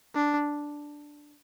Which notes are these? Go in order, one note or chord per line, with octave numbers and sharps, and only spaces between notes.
D4